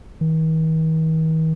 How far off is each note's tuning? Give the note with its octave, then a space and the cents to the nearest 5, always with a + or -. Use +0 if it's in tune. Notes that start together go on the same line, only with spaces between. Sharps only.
D#3 +45